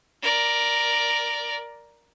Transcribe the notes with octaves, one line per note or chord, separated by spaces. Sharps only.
A#4 D5